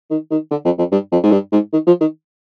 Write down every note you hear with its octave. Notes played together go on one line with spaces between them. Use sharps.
D#3
D#3
D3
F2
F2
G2
F2
G#2
G2
G#2
D#3
F3
D#3